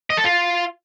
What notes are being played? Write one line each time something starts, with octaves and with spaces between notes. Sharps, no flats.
D#5
A4
F4